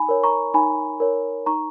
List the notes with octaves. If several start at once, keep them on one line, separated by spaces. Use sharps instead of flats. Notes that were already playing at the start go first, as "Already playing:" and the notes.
Already playing: D#4 G#5 B5
A#4 C#5
A#5 C#6
D#4 G#5 B5
A#4 C#5
D#4 A#5 C#6